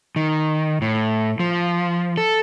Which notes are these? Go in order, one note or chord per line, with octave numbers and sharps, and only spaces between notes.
D#3
A2
F3
A4